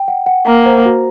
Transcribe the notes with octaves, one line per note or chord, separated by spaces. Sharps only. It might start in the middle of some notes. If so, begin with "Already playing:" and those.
Already playing: G5
F#5
F#5
A#3 A#5
C5
F#4